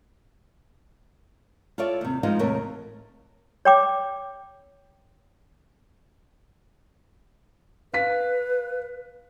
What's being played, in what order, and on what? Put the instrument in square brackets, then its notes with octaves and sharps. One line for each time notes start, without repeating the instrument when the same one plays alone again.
[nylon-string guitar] F4 A4 C#5 D5 E5
D#2 C3
F3 G3 G#3 B3 D#4 F4
E2 A2 C3 A4 A#4 C#5
[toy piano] C#5 G5 D6
[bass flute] B4 [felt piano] F5 B6